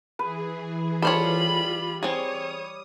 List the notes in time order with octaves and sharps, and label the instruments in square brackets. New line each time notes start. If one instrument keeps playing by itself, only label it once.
[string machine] E3 G#4 [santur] B4
[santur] G3 [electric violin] F4 B5 [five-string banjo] A4 C5 C#5
[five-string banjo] C4 G#4 [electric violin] C#5 [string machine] D#6